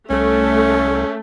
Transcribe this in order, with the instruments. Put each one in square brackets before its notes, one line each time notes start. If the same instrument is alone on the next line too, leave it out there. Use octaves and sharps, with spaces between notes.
[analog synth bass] C2 [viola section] A3 [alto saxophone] C#4